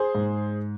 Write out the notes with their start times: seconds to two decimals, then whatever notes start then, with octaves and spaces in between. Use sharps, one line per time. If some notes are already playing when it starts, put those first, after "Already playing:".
Already playing: G#4 C5
0.15 G#2